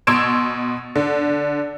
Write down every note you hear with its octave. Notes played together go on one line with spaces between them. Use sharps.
B2 C6 E6 G#6 D7 E7
D3